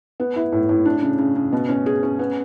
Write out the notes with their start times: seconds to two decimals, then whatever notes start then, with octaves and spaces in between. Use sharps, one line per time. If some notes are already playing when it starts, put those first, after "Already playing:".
0.20 B3
0.36 E4
0.52 A2
0.69 A2
0.85 D4
1.02 C#3
1.19 C#3
1.36 C#3
1.53 B2
1.69 C#4
1.86 G#4
2.03 C#4
2.19 B3